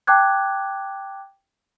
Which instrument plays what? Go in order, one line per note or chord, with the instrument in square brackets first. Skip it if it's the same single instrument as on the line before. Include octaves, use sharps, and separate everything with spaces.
[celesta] G5 A5 D6 F#6 G#6